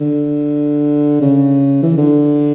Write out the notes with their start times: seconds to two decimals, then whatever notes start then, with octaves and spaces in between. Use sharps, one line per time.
0.01 D3
1.22 C#3
1.83 E3
1.98 D3